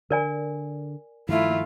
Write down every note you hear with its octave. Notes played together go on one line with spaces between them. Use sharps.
D3 A#4 D5 G#5
G2 D#3 F3 A3 E4 F4